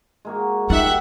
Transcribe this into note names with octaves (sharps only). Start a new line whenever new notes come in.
G#3 A#3 F#4
D#4 F4 G4 E5 F#5